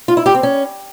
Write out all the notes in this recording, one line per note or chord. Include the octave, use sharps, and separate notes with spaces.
F4
E4
G4
C4
C#4